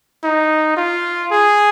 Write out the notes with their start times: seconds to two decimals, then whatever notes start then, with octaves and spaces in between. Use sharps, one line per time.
0.23 D#4
0.77 F4
1.31 G#4